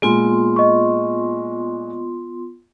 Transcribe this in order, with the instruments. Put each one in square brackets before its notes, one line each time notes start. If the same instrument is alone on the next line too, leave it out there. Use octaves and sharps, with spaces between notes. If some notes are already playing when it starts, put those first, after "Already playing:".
[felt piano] A#2 G#3 [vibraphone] B3 F4 C6
[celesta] D#5 C#6